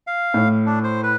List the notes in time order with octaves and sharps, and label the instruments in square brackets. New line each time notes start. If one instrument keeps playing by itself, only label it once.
[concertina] F5
[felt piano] A2
[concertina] D4
C5
B4